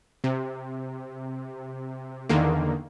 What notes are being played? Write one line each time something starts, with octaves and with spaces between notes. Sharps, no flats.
C3
E2 D3 D#3 A#3